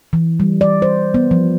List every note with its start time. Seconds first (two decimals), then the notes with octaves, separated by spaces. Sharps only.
0.13 E3
0.40 G3
0.61 D5
0.82 C5
1.14 B3
1.31 F3